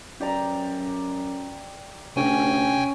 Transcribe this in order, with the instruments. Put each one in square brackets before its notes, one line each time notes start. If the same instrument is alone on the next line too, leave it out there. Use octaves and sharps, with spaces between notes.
[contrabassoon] F#2 [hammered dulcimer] G4 D5 A#5
[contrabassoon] D2 [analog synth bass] C3 [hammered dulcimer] C#4 [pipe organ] G5 G#5